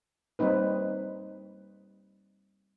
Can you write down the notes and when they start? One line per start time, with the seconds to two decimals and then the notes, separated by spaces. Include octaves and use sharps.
0.39 G3 A#3 C4 D#4 B4